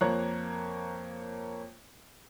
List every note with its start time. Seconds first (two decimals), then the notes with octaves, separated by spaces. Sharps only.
0.01 F2 A#3 C#5 A#5 F#6